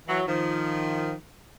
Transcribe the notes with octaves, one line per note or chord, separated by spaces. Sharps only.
E3 F#3
D#3 F3